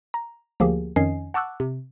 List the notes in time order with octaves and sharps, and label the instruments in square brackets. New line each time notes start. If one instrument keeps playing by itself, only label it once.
[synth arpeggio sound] A#5
D2 F3 A#3 G4 G#4
F2 D#3 C#4 D#5 G#5 C7
F#5 A5 C#6 D6 E6 F#6
C3